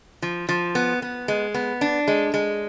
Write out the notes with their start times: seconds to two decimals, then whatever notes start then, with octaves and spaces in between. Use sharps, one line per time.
0.22 F3
0.49 F3
0.75 B3
1.02 B3
1.28 G#3
1.54 B3
1.81 D4
2.08 G#3
2.34 G#3